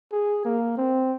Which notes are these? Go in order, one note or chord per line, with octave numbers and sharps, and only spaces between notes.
G#4
A#3
C4